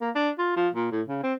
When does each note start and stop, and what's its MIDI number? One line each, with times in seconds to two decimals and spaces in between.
0.01 0.10 58
0.15 0.30 62
0.39 0.55 65
0.57 0.69 53
0.74 0.89 46
0.91 1.02 45
1.08 1.20 49
1.23 1.34 60